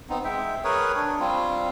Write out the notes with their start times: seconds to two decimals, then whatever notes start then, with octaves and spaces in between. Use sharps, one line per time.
0.09 B3 C4 D#4
0.24 G#3 E5 G5
0.64 G#4 A#4 B4 C#5
0.95 D4
1.20 G3 C4 F4